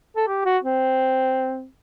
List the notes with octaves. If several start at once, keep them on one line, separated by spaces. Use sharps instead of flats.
A4
G4
F#4
C4